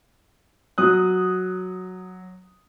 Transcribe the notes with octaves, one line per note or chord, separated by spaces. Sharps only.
F#3 D#6 F#6